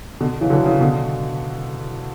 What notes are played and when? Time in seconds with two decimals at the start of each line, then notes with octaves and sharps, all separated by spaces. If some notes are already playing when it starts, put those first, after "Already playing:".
0.21 B2 D3
0.41 C#3 E3
0.50 D3 F#3
0.66 C#3 E3
0.80 B2 D3